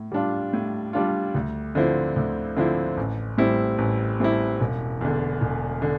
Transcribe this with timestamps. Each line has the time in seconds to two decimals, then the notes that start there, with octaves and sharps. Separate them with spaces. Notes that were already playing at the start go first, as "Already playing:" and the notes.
Already playing: A2
0.12 G3 D4 F4
0.53 A2
0.93 G3 D4 F4
1.35 D2
1.75 D3 F3 C4 E4
2.16 D2
2.57 D3 F3 C4 E4
2.97 A1
3.38 A2 G3 C4 E4
3.78 A1
4.20 A2 G3 C4 E4
4.61 E1
5.01 E2 D3
5.41 E1
5.82 D3